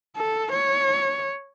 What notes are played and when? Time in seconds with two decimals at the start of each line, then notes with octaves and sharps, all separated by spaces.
0.16 A4
0.52 C#5